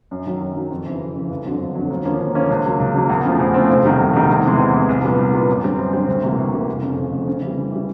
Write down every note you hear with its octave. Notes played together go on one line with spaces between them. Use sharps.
F#2
D#3 F#3
F#2
D#3 F#3
F2
C#3 E3
F2
C#3 E3
G1
F2 D3 F#3
G1
F2 D3 F#3
D#2
D3 F3 A#3 C#4
D#2
D3 F3 A#3 C#4
C#2
C#3 F#3 A#3
C#2
C#3 F#3 A#3
E2
C#3 F3 A3 C4
E2
C#3 F3 A3 C4
F1
E2 C3 D#3 G3
F1
E2 C3 D#3 G3
E2
C3 E3 G#3
E2
C3 E3 G#3
C2
A#2 G3 B3
C2
A#2 G3 B3
F#2
D3 G3 C4
F#2
D3 G3 C4
D2
C3 E3 G3 A#3
D2
C3 E3 G3 A#3
F1
F2 C#3
F1
F2 C#3
C#3
E3
G3
C#3
E3 G3